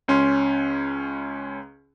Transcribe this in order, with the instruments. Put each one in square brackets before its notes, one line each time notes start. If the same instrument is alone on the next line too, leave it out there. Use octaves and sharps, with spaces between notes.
[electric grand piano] C#2 C#4 C6